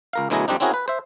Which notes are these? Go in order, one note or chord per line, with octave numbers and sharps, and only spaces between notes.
C#2 A#4 F5
D2 B2 F#3 E4 G#4 A#5
F2 G3 C4 D4 D#4
C4 C#4 E4 F#4 G#4 A#4
B4
C5 E5